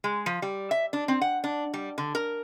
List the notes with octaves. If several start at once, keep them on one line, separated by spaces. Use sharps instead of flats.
G#3
F3
G3
E5
D4
C4
F#5
D4
G3
D3
A#4